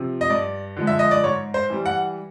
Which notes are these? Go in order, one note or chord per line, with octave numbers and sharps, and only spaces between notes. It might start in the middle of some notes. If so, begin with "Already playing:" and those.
Already playing: C3 F3
D#5
G2 D5
D3 F3 G#3
E5
D#5
D5
G#2 C#5
C5
E3 G3
F#5